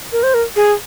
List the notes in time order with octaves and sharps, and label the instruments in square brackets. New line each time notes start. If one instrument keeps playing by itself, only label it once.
[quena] A#4
C5
A#4
G#4